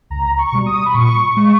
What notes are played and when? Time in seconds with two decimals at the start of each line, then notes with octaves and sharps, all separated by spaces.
0.10 C#2 A#5
0.39 C#6
0.52 B2 G3
0.66 D#6
0.86 B5
0.94 A#2 C#6
1.36 G#3